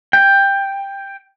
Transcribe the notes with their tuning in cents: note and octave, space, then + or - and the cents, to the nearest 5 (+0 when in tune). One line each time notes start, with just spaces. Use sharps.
G5 +10